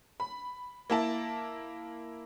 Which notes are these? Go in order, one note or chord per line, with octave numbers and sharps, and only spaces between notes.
B5
A#3 E4 A5